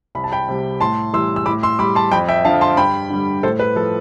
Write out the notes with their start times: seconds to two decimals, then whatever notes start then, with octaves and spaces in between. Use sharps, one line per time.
0.15 C2 B5
0.24 A5
0.32 G5 B5
0.48 C3 G3
0.80 A2 A5 C6
1.13 E3 G3 C6 E6
1.36 E6
1.46 A2 B5 D6
1.63 C6 E6
1.79 G3 B5 D6
1.95 A5 C6
2.11 F2 G5 B5
2.28 E5 G5
2.45 D3 F3 F5 A5
2.61 A5 C6
2.77 G2 G5 B5
3.10 D3 G3
3.43 A2 A4 C5
3.59 B4
3.76 F3 A4